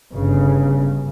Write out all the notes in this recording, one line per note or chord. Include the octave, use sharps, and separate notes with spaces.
G1 G2 C#3